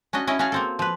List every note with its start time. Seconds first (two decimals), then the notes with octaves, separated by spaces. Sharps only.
0.13 C#4 D4 F#4 D#5
0.27 C#4 E4 D#5
0.39 C#4 F#4 G#4 F5 A5
0.52 A#3 C4 A4
0.79 F3 B4